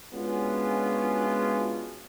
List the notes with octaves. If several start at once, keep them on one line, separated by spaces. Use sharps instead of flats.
G#3 B3 C#4 D4 F4 F#4